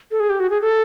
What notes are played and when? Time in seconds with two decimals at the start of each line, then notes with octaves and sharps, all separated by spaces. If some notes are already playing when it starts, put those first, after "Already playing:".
0.11 A4
0.20 G#4
0.30 G4
0.40 F#4
0.50 G#4
0.62 A4